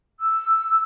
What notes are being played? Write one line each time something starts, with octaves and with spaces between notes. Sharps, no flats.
E6